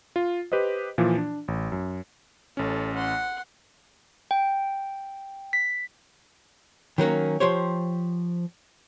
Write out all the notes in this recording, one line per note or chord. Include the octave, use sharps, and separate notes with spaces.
F4
G4 B4 C5 D#5
A#2 E3 F3
D4
A1
F#2
A1 C#4 A4
F#5 C6
G5
B6
D#3 F#3 A#3 C#4
F3 G4 C5 C#5